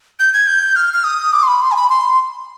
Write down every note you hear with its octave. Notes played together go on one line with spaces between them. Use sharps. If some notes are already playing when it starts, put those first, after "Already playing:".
G6
G#6
G6
F6
F6
D#6
D6
C6
B5
C6
G#5
B5
C6